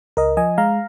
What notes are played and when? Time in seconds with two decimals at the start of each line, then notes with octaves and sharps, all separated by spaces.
0.17 C#2 A#4 D#5
0.37 F3 D#5 G#5
0.58 G#3 F5 A#5